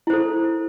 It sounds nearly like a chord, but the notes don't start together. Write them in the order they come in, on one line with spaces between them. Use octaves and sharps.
E4 C5 A4